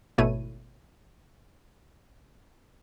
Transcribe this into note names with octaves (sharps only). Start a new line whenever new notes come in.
G#1 B2 A3 E4 C#5 D#7